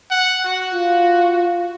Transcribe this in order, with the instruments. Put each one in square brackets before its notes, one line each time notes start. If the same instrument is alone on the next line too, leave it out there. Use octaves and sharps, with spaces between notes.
[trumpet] F#5
F#4
[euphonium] F4